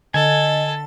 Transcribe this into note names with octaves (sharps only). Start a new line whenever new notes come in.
D3 A4 D#5 G#5 A6